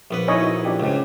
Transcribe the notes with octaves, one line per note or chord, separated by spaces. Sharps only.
A#1 B3 B4
D#4 E4 C#5 D#5 G#5
F#4
F3 D4 G4
C#2 G#2